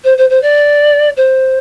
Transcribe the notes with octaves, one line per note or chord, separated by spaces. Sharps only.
C5
C5
C5
D5
C5